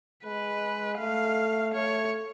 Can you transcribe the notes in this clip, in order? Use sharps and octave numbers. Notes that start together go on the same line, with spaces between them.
G#3 B4
A3 F5
A3 C#5